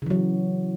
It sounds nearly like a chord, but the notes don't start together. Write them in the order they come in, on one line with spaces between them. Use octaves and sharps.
C#3 E3 F#3